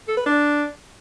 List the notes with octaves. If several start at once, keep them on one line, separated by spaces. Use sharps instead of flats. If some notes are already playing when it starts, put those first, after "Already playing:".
A4
B4
D4